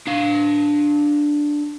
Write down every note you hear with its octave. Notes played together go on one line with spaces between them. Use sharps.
D4 F5